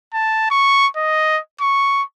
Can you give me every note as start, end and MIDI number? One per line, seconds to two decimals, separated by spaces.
0.13 0.48 81
0.51 0.87 85
0.97 1.40 75
1.61 2.03 85